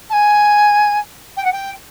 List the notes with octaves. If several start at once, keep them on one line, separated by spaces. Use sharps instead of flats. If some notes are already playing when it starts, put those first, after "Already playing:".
A5
G#5
G5
F#5
G5